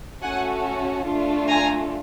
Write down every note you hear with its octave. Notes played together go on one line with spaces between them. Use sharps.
A3 C#4 F#4 A4 F#5 G#5
A3 D4 F4
G#5 A#5